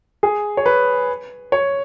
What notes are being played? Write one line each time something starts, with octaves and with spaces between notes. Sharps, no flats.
G#4
C#5
B4
C#5